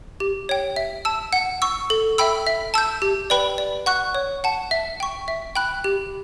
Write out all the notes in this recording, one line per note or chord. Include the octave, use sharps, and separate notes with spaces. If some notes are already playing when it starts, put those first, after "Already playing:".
G4
C#5 G5
E5
A5 E6
F#5
C#6 E6
A4
E5 G5 B5 E6
E5
A5 E6 G6
G4
B4 D5 G5 B5
D5
F#5 C#6 F#6
C#5
F#5 A5
E5
G5 C#6
E5
G5 B5 F#6
G4